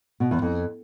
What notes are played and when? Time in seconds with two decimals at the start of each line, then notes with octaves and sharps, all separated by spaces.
0.20 B2
0.31 E2
0.42 F2